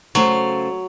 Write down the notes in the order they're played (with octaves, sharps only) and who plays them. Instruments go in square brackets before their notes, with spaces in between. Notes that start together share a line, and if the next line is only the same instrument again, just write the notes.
[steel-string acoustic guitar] C#3 A3 C5 [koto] F#3